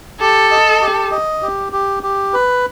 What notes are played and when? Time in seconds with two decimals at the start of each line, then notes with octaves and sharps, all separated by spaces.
0.20 G4 A4
0.51 D#5
0.81 G4
1.12 D#5
1.42 G4
1.73 G4
2.03 G4
2.34 B4